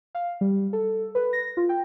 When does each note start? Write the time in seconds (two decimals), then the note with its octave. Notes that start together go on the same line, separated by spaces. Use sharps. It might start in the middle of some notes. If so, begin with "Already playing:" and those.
0.15 F5
0.41 G3
0.73 A4
1.15 B4
1.33 A#6
1.57 F4
1.69 G5